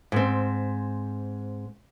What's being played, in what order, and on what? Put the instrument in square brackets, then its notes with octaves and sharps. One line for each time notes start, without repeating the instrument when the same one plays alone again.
[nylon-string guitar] G#2 C4